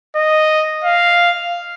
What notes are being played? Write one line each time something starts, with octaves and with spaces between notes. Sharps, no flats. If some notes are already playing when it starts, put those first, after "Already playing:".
D#5
F5